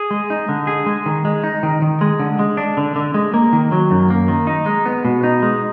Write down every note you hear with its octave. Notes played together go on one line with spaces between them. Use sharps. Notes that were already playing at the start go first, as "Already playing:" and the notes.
Already playing: G#4
G#3
D#4
D3
G#4
G#3
D#3
G#3
D#4
D#3
D#3
G#3
D3
G#3
D4
D3
D3
G#3
A#3
D#3
F#3
F#2
A#3
D#3
D#4
G#3
B3
B2
D#4
G#3